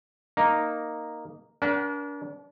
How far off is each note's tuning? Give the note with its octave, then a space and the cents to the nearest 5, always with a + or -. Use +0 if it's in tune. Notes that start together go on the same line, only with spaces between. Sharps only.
A#3 +0 D#4 -5
D4 -35 A#4 +35 F#5 +35